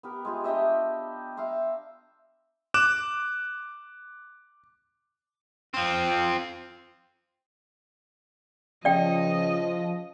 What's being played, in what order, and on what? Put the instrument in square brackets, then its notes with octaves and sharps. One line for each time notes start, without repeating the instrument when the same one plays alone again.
[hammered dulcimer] B3 G4 A#4
G#3 F4 G4
D4 G4 D#5 E5
E5 F5 A#5 C6
[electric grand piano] D6 F#6 E7
[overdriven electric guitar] F3 C4
[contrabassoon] C#3 [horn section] F3 [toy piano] D5 G5 [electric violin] D#5